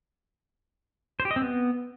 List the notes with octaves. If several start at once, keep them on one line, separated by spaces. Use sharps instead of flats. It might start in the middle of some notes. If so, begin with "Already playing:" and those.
C5
G4
D#5
C4
B3